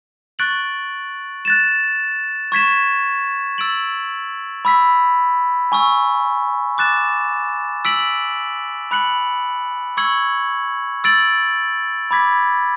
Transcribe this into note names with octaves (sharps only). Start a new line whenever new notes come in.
C#6 F#6 A6 D7 F#7
F#6 A6 E7
C#6 G#6 B6 E7
E6 A6 D7 F#7
B5 E6 B6
G#5 C#6 E6
D6 F#6 A6 E7
E6 B6 D7 F#7
B5 F#6 C#7 F#7
C#6 E6 G#6 C#7 F#7
E6 A6 D7 F#7
B5 D6 G#6 B6